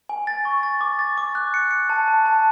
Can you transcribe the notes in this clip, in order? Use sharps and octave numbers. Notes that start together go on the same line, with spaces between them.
G#5
A6
C#6
A6
D6
A6
D6
F#6
C#7
C#7
A5
A5
A5